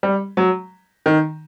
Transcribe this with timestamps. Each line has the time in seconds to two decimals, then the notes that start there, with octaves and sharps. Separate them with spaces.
0.03 G3
0.37 F#3
1.06 D#3